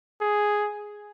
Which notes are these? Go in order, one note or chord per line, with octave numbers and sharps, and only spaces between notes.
G#4